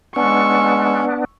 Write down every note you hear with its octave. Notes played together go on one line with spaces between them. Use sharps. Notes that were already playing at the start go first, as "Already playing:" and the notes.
G#3 B3 C#4 D4 C#6 E6